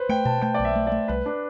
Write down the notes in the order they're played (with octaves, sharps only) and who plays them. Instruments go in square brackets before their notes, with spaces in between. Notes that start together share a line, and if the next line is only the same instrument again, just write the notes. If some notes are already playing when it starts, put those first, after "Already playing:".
Already playing: [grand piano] B4 C5
[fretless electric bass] A3 [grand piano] G5
[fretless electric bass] B2 [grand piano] A5
[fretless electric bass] A3 [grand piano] G5
[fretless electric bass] B1 [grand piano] D5
[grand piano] E5
[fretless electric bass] A3
[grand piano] D5
[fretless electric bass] A3
[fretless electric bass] C2 [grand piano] B4
[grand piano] D4